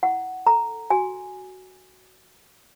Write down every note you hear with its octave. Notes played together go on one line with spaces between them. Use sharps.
E4 F#5
A4 A#5
F#4 G#5